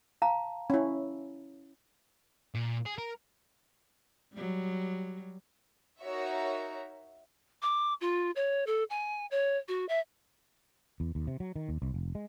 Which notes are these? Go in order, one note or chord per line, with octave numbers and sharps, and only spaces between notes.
F5 A5 A#5
C#4 E4
A#2
G#4
A#4
F#3 G3
D#4 F#4 A#4 C#5 E5
D6
F4
C#5
A4
G#5
C#5
F#4
E5
E2
D#2
C3
F#3
D#3
D#2
C2
F1
G#3